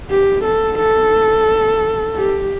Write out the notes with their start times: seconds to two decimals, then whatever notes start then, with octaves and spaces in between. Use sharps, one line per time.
0.11 G4
0.44 A4
0.79 A4
2.16 G4